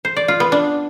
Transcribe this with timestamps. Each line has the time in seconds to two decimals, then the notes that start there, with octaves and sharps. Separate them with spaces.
0.05 C5
0.16 D5
0.28 F4
0.40 B3
0.52 D4